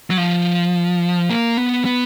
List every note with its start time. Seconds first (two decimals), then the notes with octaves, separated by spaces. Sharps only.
0.10 F#3
0.18 F3
1.30 A#3
1.57 B3
1.85 B3